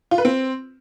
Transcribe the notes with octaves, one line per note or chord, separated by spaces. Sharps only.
F4
B4
C4